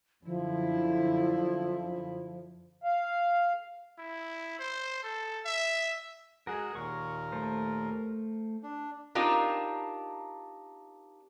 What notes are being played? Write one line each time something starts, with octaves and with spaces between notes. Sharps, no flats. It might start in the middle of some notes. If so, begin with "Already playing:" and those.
F#2 D3 F3 E4
F5
E4
C5
A4
E5
G#3 F#4 G#4 A#4 F#5
D#2 A#2 A#4 C#6
A3 C5
D4
C4 D4 D#4 F4 G4 A#4